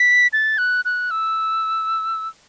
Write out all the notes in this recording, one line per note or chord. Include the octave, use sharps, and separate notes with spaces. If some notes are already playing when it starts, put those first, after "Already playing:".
Already playing: B6
A6
F#6
F#6
E6